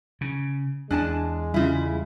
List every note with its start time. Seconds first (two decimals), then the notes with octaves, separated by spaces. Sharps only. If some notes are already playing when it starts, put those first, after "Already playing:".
0.21 C#3
0.91 E2 G#3 D4 G#5 A5
1.54 C#3 G3 E4 F4